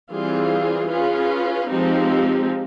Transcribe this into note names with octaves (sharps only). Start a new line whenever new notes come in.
E3 G3 C4 F4 G#4
C#4 F4 G#4 B4
F3 G#3 C4 D#4 G4